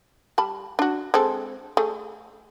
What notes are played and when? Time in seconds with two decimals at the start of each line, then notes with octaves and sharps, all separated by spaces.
0.38 G3 A5 B5
0.79 D4 F#4
1.14 G#3 C4 A4
1.77 A3 G#4